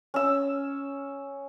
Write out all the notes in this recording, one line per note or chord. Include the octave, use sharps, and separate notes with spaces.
C#4 E6